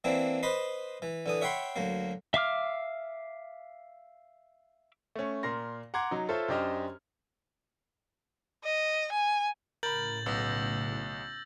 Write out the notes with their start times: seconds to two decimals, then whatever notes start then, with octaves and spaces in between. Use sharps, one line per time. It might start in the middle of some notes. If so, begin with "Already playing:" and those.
0.04 E3 A#3 C4 D4 E4
0.43 B4 C5 D#5 B5 C6
1.02 E3
1.26 D3 E3 D#6
1.41 C#5 E5 F#5 G5 B5 C6
1.76 D2 F#3 A#3
2.34 E5 F5 D6 F6
5.16 A3 C#4
5.43 A#2 A#4 C6 A#6
5.94 F#5 A#5 C6 D6 G#6
6.11 F#3 D#4
6.29 F4 A4 C5 C#5 E5
6.48 F#2 D4 G4 C5 D#5 F6
8.65 D#5
9.12 G#5
9.83 A2 C#3 A#4 B5 G6 A6 F#7
10.26 B1 B3 E6 A#6